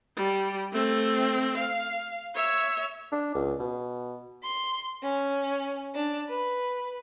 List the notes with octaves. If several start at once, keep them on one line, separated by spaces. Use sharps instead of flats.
G3
A3 C4
F5
C#5 E5
D4
C#2
B2
C6
C#4
D4
B4